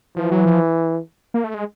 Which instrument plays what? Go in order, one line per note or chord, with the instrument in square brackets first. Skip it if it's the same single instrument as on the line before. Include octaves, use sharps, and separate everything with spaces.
[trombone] E3 [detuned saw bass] F3
[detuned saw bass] F#3
F3
A#3
A3
G#3